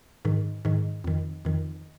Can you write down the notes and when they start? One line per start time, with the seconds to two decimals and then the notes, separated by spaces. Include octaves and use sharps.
0.25 G#2 D#3
0.65 G#2 D#3
1.04 F2 D#3
1.45 F2 D#3